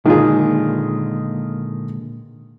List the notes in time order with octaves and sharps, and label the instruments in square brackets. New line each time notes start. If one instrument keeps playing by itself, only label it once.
[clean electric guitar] A#2 D3 G#3 [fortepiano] D#3 F4 G#4